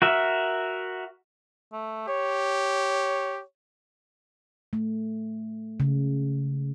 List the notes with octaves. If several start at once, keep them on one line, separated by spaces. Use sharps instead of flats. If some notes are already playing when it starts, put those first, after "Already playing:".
F#4 A#4 E5
A3
G4 C#5
A3
C#3